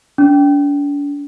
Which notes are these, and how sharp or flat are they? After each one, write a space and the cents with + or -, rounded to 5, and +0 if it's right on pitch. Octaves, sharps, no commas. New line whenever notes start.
D4 -40